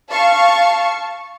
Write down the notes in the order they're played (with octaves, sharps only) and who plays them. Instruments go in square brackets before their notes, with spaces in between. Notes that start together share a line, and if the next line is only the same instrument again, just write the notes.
[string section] F5 A5 C#6